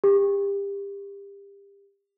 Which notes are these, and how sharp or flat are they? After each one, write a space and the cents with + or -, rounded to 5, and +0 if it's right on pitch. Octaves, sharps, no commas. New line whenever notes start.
G4 +30